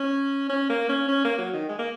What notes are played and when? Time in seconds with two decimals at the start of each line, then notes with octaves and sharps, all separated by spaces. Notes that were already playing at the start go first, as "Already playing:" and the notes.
Already playing: C#4
0.49 C#4
0.69 A#3
0.89 C#4
1.08 C#4
1.24 A#3
1.38 F#3
1.54 D#3
1.69 G#3
1.79 A#3